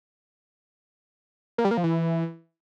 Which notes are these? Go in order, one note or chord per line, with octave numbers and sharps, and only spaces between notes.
A#3
G3
A#3
F3
E3